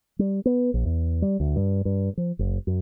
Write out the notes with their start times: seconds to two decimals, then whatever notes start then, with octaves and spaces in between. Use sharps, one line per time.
0.19 G3
0.46 B3
0.74 A#1
0.85 E2
1.22 G3
1.40 D2
1.56 G2
1.85 G2
2.17 F3
2.39 F#1
2.67 F#2